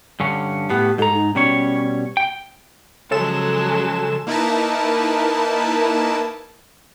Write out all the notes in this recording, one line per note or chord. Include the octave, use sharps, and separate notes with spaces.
G2 D3 C#4
A2 B3 G4
G#2 A4 A#5
D#4
B2 G3 C#4 C#5
G5
C#3 F3 F#3 G#3 A4 E7
A#3 D#4 E4 A#4 B4 A5